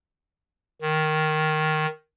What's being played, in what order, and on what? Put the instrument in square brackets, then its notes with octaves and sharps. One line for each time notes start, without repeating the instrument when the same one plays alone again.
[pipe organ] D#3